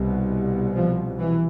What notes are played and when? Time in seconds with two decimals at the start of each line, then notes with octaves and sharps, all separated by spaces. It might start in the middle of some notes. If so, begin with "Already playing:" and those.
Already playing: C2 B2
0.75 F3
1.19 E3